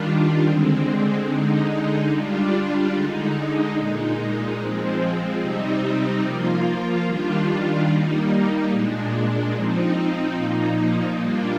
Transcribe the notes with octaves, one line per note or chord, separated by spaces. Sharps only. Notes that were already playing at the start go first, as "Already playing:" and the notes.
Already playing: D#3 G3 D4 F4
D3 G#3 C4
D3 G#3 D#4
G3 D4 F4
D3 G#3 D#4
A#2 G#3 D#4
F3 G#3 C4
C3 G3 C4 D#4
F3 A#3 F4
D#3 G3 D4 F4
G3 A#3 D#4
A#2 G#3 D4
F3 C4 D#4
A#2 F3 A#3 D#4
G3 A#3 D4 F4